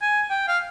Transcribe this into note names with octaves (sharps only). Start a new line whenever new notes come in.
G#5
G5
F5